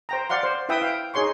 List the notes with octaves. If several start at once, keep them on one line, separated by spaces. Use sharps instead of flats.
C5 G5 A#5
D5 F5 F#5 C6
C5
E4 B4 E5 G5 D#6
F5 G5
D#4 G#4 C#5 C6 C#6